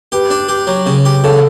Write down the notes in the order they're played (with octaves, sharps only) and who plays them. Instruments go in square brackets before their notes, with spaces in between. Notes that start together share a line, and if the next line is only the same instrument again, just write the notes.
[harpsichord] G4 [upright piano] B4
[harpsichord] D4
G4
F#3
C#3
G4
[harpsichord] C#3 [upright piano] A4